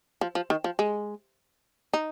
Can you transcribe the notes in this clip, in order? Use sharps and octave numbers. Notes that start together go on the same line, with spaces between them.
F3
F3
D#3
F3
G#3
D#4